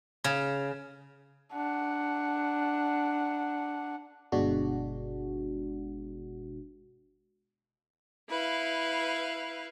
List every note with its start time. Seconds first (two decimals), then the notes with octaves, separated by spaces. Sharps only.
0.24 C#3
1.53 D4 F#5
4.32 G1 B2 G#3 D4 F#4
8.29 E4 B4 F5